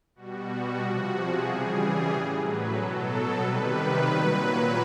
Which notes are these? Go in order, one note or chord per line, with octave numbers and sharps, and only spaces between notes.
B2 G3 F#4
C3 F3 F#4
G#4
C#3 E3 G3 G#4
A2 F#3
B4
B2 F#3 A4
A4
C3 D#3 G3 B4
A#2 F#3